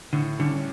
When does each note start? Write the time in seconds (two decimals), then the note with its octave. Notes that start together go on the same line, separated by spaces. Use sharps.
0.13 A2 D3
0.39 D3 G3 C#4 G4